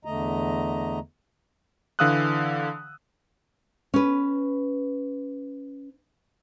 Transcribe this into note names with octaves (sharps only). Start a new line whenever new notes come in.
E2 D3 A3 D#5 A#5
D3 E3 F5 D#6 E6 F#6
C#4 B4